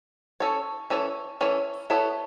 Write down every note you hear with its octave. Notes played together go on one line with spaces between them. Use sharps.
C#4 A4 C#5
E3 C#4 A4 C#5
E3 C#4 A4 C#5
B3 E4 A4 C#5